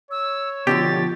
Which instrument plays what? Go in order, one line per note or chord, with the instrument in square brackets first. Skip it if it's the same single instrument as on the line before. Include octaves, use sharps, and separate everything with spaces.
[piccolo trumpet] C#5 [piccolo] E6
[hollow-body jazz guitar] B2 D3 F3 [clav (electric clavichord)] G4 [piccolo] A6